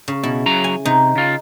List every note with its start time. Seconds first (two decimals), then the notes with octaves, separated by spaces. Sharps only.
0.08 C#3
0.23 B2 E4
0.46 C#3 F#3 A#5
0.64 G#5
0.85 C3 D#4
1.16 C#3 F4